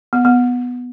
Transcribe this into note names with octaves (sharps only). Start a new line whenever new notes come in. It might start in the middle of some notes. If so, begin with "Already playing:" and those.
B3
B3